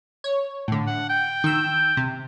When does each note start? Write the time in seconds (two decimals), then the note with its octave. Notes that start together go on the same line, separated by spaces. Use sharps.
0.24 C#5
0.68 A2 D3
0.87 F#5
1.10 G5
1.44 D#3 E6
1.97 C3